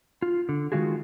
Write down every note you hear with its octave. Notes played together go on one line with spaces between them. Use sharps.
F4
D3
D#3 G#3 F4 F#4 G#4